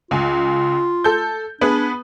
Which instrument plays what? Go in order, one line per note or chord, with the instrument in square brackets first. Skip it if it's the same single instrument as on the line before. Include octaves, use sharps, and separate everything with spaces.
[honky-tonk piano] C#2 G#5 [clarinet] F4
[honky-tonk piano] A4 G6
[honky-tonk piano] B3 G#4 B4 [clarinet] D4